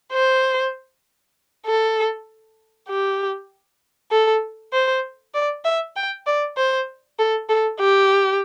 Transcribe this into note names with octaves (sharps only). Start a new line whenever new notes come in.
C5
A4
G4
A4
C5
D5
E5
G5
D5
C5
A4
A4
G4